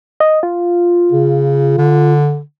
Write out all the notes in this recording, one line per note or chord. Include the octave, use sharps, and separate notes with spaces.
D#5
F4
C#3
D3